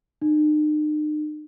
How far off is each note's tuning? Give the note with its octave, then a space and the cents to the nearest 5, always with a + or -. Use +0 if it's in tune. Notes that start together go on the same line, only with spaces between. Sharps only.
D#4 -45